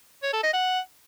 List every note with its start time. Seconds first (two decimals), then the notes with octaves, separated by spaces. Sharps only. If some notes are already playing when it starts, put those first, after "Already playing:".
0.23 C#5
0.33 A4
0.43 D#5
0.54 F#5